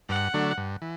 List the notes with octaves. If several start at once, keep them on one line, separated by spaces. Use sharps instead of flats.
G2 F#5
D3 F#3 A3 D4
G2
E3